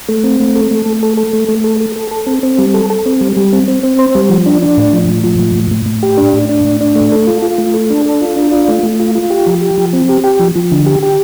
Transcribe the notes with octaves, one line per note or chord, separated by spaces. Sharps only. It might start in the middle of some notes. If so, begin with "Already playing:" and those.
A3
C4
A3
A4
A3
A3
A4
A4
A3
A3
A4
A4
A4
A4
C4
C4
G3
A4
A4
C4
G3
G3
C4
C4
C4
C5
G3
F3
D4
D4
A2
F3
A2
F3
A2
A2
A2
A2
G4
D4
A2
D4
A2
D4
A3
A4
F4
F4
A3
A4
D4
A4
F4
D4
F4
A3
A3
F4
F4
G4
F3
G4
F3
C4
G4
G4
F3
F3
D3
G4
G4